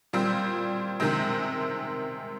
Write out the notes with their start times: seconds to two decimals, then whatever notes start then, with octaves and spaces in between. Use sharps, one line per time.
0.13 A#2 G3 C4
1.00 C3 D#3 G#3 C4